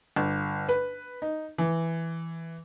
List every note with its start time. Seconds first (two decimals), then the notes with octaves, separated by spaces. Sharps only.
0.16 G1
0.69 B4
1.22 D#4
1.58 E3